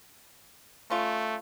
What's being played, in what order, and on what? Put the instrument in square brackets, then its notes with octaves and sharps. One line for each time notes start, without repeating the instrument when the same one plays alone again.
[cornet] A3 [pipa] C#4 F4